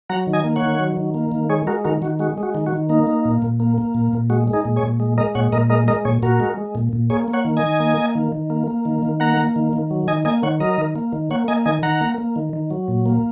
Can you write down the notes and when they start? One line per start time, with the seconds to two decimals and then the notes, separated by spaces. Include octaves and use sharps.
0.10 F#3 F#5 A#5
0.27 D#3
0.33 D#5 G#5
0.44 A#3
0.56 C#5 F#5
0.62 D#3
0.80 F#3
0.97 D#3
1.14 A#3
1.32 D#3
1.49 G#3 G#4 C#5
1.67 G#3 F#4 A#4
1.84 D#3 F#4 A#4
2.02 D#3 F#4
2.19 G#3 F#4
2.38 G#3
2.43 F#4
2.55 D#3
2.67 F#4
2.73 D#3
2.89 A#3 D#4
3.07 A#3
3.25 A#2
3.42 A#2
3.60 A#3
3.78 A#3
3.94 A#2
4.13 A#2
4.30 G#3 F#4
4.48 G#3
4.53 D#4 G#4
4.65 A#2
4.76 G#4 C#5
4.83 A#2
5.00 G#3
5.18 G#3 A#4 D#5
5.35 A#2 C#5 F#5
5.52 A#2 A#4 D#5
5.70 G#3 A#4 D#5
5.88 G#3 A#4 D#5
6.05 A#2 G#4 C#5
6.22 A#2 F#4 A#4
6.40 G#3
6.58 G#3
6.75 A#2
6.93 A#2
7.10 A#3 G#4 C#5
7.28 A#3
7.33 C#5 F#5
7.45 D#3
7.57 D#5 G#5
7.63 D#3
7.80 A#3
7.98 A#3
8.15 D#3
8.32 D#3
8.50 A#3
8.68 A#3
8.85 D#3
9.03 D#3
9.20 A#3 F#5 A#5
9.37 A#3
9.56 D#3
9.73 D#3
9.91 F#3
10.08 D#3 D#5 G#5
10.25 A#3 D#5 G#5
10.43 D#3 C#5 F#5
10.60 F#3 A#4 D#5
10.78 D#3
10.96 A#3
11.13 D#3
11.31 A#3 C#5 F#5
11.48 A#3 D#5 G#5
11.66 D#3 D#5 G#5
11.83 D#3 F#5 A#5
12.01 A#3
12.18 A#3
12.36 D#3
12.53 D#3
12.70 F#3
12.88 A#2
13.06 A#3